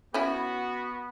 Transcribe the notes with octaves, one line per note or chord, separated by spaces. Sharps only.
B3 C#4 E4 F#4